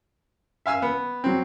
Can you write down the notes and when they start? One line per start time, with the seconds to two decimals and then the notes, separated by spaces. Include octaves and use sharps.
0.66 E5 F5 G#5 E6
0.82 B3
1.24 F#3 C4